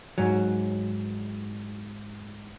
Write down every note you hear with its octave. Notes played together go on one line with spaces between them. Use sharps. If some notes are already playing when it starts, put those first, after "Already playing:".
G#2 F#3